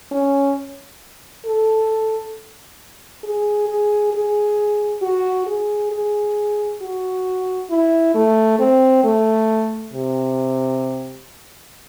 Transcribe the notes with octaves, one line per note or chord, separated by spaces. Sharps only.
C#4
A4
G#4
G#4
G#4
F#4
G#4
G#4
F#4
E4
A3
C4
A3
C3